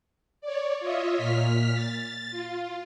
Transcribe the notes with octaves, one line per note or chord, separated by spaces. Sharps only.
C#5 D5
F4 C#5 D#5 E5
A#2 F6 B6
A6
F4